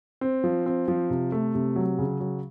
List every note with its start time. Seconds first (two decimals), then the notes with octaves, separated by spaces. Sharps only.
0.21 C4
0.44 F3
0.66 C4
0.88 F3
1.10 C3
1.32 A3
1.55 C3
1.76 F#3
1.99 C#3
2.20 F#3